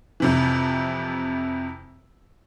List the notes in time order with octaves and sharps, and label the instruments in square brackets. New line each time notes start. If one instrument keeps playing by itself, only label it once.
[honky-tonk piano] F2 C3 E3